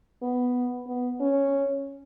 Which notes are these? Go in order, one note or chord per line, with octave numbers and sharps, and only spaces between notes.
B3
B3
C#4